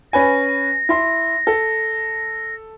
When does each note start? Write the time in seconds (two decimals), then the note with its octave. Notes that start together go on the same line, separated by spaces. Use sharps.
0.13 C#4 B4 G#5 A#6
0.89 E4 C6
1.47 A4